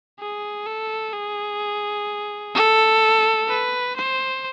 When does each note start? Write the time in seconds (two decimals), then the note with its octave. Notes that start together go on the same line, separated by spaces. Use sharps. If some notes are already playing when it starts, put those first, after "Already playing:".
0.19 G#4
0.66 A4
1.13 G#4
2.54 A4
3.48 B4
3.96 C5